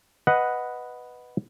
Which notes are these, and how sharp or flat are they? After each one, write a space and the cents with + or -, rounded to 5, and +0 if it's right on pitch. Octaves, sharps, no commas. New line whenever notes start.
B4 +0 D#5 +0 F#5 +0